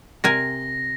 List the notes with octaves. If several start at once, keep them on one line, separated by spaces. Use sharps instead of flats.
C3 A#4 G#5 A#6